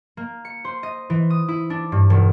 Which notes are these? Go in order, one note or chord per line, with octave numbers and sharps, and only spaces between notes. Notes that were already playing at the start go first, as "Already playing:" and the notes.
A#3
C#7
C5
D#5
E3
D#6
E4
D4
G2
E1